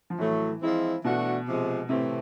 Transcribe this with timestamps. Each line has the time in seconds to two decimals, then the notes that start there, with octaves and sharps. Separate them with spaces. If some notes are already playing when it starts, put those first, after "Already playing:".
0.10 F3
0.19 A2 E3 F#3 A3
0.61 F3 G#3 C4 E4
1.04 B2 E3 A3 D4 F#4
1.47 C3 F3 G#3
1.89 A2 C3 E3 A3 C4 E4